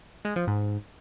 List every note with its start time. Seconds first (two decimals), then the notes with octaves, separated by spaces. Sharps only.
0.25 G#3
0.36 F3
0.47 G#2